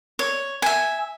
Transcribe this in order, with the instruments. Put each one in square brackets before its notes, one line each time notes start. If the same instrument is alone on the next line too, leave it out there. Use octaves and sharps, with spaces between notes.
[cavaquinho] C#5
E5 G#5